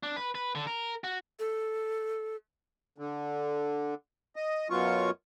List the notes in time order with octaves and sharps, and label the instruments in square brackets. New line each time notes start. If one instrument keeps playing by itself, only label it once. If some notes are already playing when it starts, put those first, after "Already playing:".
[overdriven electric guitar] D4
B4
B4
D3
A#4
F#4
[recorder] A4
[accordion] D3
D#5
F#2 B2 F#3 F4 C#6